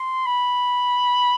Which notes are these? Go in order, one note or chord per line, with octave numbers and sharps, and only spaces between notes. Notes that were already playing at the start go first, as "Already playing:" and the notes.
Already playing: C6
B5